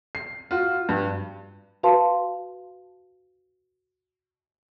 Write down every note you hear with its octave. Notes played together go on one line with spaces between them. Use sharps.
C7
F4 F#4
G2
F#4 B4 F5 A5 C6